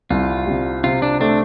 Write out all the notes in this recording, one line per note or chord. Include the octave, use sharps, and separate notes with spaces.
C2 F4
C3 G3
C3 F4
D4
A3 C4 D4